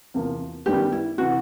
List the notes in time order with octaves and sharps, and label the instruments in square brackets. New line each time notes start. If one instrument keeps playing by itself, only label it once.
[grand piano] E2 C3 F3 A#3
[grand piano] F#2 D#3 G3 B3 [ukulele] G4
[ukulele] E4
[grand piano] C3 E3 [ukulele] F#4